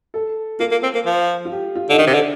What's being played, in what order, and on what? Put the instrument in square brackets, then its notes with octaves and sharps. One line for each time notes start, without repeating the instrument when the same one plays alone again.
[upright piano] A4
[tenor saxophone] A#3 [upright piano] F4
[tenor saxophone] A#3
C4
A#3
F3
[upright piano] F4
G4
F4
[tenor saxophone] D3 [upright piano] D#4
[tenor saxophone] D#3 [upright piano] D4
[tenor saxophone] C3
D3